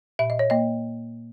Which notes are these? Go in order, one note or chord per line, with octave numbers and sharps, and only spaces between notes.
A#2 E5
D#5
C#5
A#3 D#5